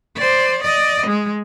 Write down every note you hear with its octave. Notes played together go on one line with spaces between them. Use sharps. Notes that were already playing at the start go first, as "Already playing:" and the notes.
C5 D5
D5 D#5
G#3